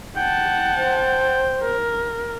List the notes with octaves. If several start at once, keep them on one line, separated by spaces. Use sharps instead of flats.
F#5 G5 A5
C5
A#4